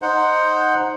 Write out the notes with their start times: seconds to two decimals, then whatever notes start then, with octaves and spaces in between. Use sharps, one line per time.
0.02 D#4 C5 F#5